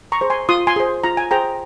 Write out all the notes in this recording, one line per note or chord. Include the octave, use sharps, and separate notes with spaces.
A#5 C#6
G#4 C5
G#5 C6
F4 C6 D#6
G#5 C6
G#4 C5
F4 A#5
G#5
G#4 C5 G5 A#5